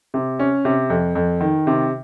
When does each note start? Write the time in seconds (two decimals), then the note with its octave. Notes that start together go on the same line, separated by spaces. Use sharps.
0.14 C3
0.39 C#4
0.65 C3
0.90 F2
1.15 F2
1.41 D#3
1.67 C3